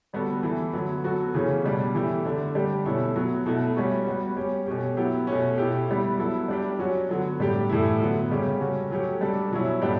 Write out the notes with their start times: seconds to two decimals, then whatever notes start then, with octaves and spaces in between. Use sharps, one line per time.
0.13 D3 G3 B3 F#4 A4
0.43 E3 A3 E4 A4
0.73 D3 F#3 B3
1.04 F#3 B3 F#4 A4
1.34 C#3 E3 A3 C#4
1.64 B2 G3 D4
1.94 E3 A3 E4 G4
2.25 D3 A3 D4
2.55 D3 G3 D4 G4
2.85 B2 A3 C#4 E4 A4
3.16 F#3 B3 F#4
3.46 B2 A3 E4 A4
3.76 G3 C#4 F#4
4.07 G3 B3 F#4
4.37 G3 C#4 G4
4.66 B2 A3 C#4 G4
4.97 F#3 B3 E4 G4
5.27 B2 A3 C#4
5.58 B2 A3 E4 G4
5.88 G3 B3 E4
6.18 F#3 B3 E4 A4
6.48 G3 D4 G4
6.79 F#3 C#4 F#4
7.09 D3 F#3 B3
7.39 A2 G3 D4 G4
7.69 A2 E3 A3 E4
8.00 D3 F#3 B3
8.30 C#3 G3 C#4 G4
8.60 G3 C#4 F#4 A4
8.91 F#3 A3 C#4 G4
9.21 G3 D4 A4
9.51 B2 F#3 C#4 E4
9.82 A2 G3 B3 D4 G4